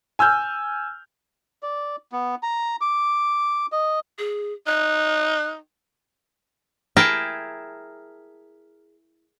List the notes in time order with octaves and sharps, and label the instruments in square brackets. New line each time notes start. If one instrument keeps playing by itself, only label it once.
[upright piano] G#5 E6 F6 G6
[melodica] D5
B3
A#5
D6
D#5
[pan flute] G#4
[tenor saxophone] D#4 [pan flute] F#6
[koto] E4 G#4 A#4 G5 A5